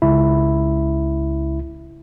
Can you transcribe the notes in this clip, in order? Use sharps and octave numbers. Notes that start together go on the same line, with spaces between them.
C#2 E4